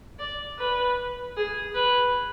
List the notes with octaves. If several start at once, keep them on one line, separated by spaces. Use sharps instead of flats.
D5
B4
G#4
B4